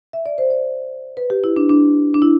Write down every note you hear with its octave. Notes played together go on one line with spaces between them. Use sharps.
E5
D5
C5
D5
B4
G4
E4
D4
D4
D4
E4